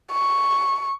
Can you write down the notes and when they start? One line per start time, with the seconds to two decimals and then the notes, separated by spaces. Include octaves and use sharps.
0.12 C#6